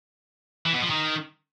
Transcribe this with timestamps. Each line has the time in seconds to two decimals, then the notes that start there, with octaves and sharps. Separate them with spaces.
0.66 E3
0.74 B2
0.82 F3
0.90 D#3